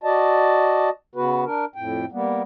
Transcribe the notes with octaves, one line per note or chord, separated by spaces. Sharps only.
F#4 D5 D#5 A5
C#3 B3 F#4 B4
D4 A#4
F2 A2 G5
G3 A#3 B3